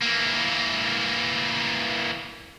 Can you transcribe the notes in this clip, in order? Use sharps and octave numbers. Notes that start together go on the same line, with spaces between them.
E3 A#3